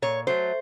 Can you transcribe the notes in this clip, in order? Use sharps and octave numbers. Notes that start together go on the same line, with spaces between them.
A#2 C#5
F#3 A3 C5